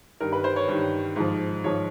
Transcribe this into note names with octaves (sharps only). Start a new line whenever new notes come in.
G2 D#3 A#4
B4
C5
C#5
G2 D#3 C#5
G#2 F3
G#2 F3 C#5